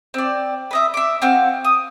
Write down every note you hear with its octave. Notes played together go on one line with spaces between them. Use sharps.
C4 D5
B4 D#5 E5
E5 D6
C4 F#4 F5
D#6